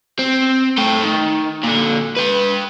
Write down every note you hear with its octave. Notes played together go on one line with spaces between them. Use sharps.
C4
A3 G5
D#3
A#2 D3
B4 G5